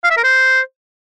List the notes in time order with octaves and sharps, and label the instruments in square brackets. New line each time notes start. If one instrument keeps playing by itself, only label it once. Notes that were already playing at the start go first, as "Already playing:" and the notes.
[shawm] F5
E5
A#4
C5